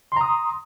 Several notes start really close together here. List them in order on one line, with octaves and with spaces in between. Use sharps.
C6 A#5 D#6